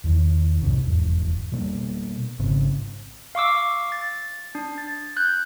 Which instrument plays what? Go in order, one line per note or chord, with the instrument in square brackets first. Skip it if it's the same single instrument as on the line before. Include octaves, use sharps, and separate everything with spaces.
[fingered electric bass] E2 D#3
C2 G#2 C3
F1 E2 G#2
B2 G3 A#3 D4
G#1 G#2 C#3 C4
[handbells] F5 C#6 D6 E6
A6
D4
A6
F#6 G6